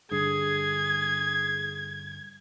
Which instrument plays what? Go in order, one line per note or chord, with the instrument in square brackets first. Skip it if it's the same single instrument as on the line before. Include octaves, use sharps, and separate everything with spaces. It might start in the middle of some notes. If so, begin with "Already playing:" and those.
[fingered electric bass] G2 D3 [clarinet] G#4 [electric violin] G#6